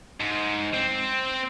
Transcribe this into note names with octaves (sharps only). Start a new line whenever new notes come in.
G#2
C4